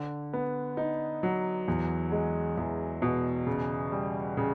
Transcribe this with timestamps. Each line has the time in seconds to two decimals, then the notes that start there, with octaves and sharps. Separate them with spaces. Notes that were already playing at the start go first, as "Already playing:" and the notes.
Already playing: D3
0.33 B3
0.77 D#4
1.23 F#3
1.68 E2
2.12 G#3
2.57 E2
3.02 B2
3.47 C#3
3.92 G3
4.37 C#3